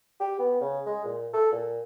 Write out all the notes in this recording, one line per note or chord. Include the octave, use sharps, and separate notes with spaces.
G4
B3
C#3
G#3
A#2
A4
A#2